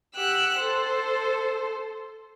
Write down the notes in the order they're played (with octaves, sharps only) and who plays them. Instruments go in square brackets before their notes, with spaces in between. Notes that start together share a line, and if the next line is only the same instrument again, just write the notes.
[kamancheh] G4 F#5 [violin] E6 F#6
[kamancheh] A4 [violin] C5